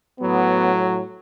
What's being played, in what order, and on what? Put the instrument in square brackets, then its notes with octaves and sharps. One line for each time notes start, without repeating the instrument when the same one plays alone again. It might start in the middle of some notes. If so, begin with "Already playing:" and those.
[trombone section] A2 F#3 B3